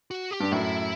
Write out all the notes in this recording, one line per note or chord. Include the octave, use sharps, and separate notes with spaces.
F#4
G4
G2
F#2 A2 E4